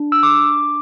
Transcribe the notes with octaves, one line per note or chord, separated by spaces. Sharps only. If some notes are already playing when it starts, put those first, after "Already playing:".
Already playing: D4
E6
D6